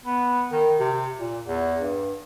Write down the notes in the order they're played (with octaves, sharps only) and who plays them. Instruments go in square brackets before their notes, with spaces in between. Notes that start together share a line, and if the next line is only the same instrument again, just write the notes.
[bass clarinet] B3
D#3
C3
A#2
E2
G2